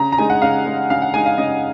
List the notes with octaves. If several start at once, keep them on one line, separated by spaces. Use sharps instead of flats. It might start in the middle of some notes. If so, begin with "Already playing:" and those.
Already playing: C#3 A#5
A#5
G#3 D#4 G#5
F#5
C#3 F5
G#3 D#4
C#3 F5
F#5
G#3 D#4 G#5
F5
C#3 D#5